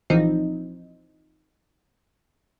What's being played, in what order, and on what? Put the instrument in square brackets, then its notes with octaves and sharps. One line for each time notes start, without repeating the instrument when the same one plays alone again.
[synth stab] A#1 E3 F3 C4 D#4